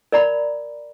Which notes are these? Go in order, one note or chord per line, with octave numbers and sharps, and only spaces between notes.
A#4 D5 A#5 B5